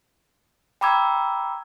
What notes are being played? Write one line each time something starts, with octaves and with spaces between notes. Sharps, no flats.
G5 A#5 B5 D6 E6 G#6